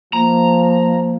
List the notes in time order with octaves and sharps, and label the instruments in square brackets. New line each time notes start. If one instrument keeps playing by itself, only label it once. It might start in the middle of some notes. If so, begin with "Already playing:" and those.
[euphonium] F3 [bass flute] A#3 [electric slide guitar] A#5